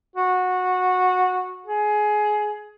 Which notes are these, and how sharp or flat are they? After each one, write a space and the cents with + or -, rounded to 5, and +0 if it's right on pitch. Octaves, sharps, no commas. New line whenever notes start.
F#4 -15
G#4 +20